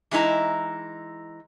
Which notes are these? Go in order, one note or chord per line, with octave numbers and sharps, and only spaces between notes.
E3 G#3 D#4 E4 A#5